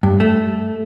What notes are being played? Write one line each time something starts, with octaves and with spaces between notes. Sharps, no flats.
G2
A3